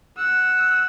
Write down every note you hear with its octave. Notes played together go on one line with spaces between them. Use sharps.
F#5 E6